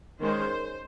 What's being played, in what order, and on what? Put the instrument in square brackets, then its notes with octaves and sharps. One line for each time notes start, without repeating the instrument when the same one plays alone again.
[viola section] D#3 G#3 C#4 C5